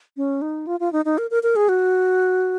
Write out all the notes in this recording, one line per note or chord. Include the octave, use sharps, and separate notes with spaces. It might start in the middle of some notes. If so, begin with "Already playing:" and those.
C#4
D#4
F4
F4
D#4
D#4
A#4
A#4
A#4
G#4
F#4